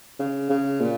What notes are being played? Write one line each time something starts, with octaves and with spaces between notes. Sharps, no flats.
C#3
C#3
A#2